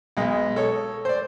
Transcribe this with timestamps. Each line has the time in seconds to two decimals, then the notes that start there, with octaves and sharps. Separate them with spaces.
0.17 B1 G#3
0.56 A4 C#5
1.05 C5 D5